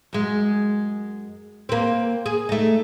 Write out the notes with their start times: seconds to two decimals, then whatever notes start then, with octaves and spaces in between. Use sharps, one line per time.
0.13 F#2 G#3
1.69 A#3 C4
2.26 G#4
2.49 A3 D#4